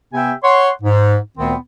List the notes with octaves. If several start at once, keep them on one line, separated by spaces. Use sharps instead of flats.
C3 B3 G4 E5 G5 G#5
C#5 F#5 C6
G#2
D2 A#2 D#3 B3 C4